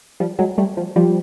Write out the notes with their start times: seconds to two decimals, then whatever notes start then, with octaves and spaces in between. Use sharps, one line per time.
0.20 F3 G3
0.39 F#3 G#3
0.58 G3 A3
0.77 F3
0.96 F3 G3